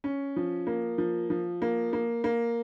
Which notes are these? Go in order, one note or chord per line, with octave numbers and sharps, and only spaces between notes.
C#4
F3
A#3
F3
F3
A#3
A#3
A#3